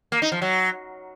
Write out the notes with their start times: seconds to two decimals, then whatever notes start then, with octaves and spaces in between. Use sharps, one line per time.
0.12 A#3
0.22 D#4
0.32 F3
0.42 F#3